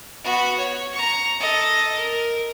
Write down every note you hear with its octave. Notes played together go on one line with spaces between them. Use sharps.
B3 F#4
C#5
A#5 C#6
A4 D#5
A#4